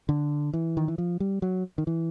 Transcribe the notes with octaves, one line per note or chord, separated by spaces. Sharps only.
D3
E3
D#3
E3
F3
G3
F#3
D#3
E3